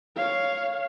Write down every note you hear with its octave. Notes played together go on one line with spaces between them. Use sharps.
C#5 F5